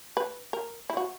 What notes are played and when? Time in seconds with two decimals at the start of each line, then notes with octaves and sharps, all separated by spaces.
0.17 B4
0.53 A#4
0.90 E4
0.97 F#4